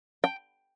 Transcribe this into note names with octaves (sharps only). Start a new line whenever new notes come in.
G5